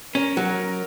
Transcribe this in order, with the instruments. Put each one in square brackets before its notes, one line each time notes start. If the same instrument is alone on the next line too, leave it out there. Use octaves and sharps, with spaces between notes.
[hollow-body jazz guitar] C#4 [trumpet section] A#4
[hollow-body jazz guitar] F#3